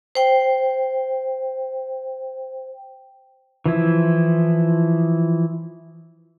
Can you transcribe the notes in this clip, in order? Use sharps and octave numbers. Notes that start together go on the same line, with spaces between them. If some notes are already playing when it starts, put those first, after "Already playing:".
C5 G5
E3 F3 E4